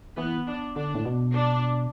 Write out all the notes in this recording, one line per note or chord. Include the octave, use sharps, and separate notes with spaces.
E3 B3
D4
D3 D4
A2
B2
D4